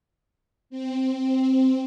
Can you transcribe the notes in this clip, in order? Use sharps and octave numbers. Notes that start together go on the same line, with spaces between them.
C4